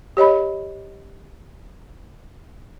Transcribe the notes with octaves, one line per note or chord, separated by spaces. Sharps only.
G4 C#5 D#5 B5